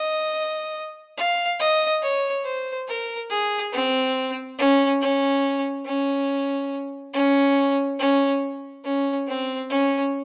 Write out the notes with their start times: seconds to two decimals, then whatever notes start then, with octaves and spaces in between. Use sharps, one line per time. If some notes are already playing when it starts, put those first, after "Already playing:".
Already playing: D#5
1.18 F5
1.59 D#5
2.02 C#5
2.45 C5
2.88 A#4
3.30 G#4
3.73 C4
4.58 C#4
5.02 C#4
5.86 C#4
7.14 C#4
7.99 C#4
8.85 C#4
9.27 C4
9.70 C#4